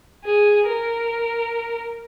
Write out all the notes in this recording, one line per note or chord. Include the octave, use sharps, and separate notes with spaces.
G#4
A#4